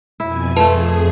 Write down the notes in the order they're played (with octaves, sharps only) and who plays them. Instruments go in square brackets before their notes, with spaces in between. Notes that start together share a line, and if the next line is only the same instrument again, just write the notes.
[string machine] F2 B2 G#5 [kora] E4
[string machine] F2 G#4 [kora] F3 A3 [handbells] B4 A5